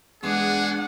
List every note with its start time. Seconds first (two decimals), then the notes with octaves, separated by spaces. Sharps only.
0.23 E2 G#3 D4 G#4 F#5